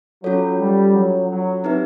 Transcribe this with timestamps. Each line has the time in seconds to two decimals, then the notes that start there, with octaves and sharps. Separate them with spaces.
0.23 F#3 C#4 F4 A4 C#5
0.59 G3
0.94 F#3
1.29 F#3
1.64 C4 D#4 G4 B4 E5